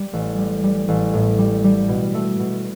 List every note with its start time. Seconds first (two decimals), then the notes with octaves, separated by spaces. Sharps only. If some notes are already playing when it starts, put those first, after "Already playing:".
Already playing: G3
0.13 A1
0.38 G3
0.63 G3
0.88 A1
1.13 A2
1.38 G3
1.64 G3
1.89 B2
2.14 A3
2.40 B2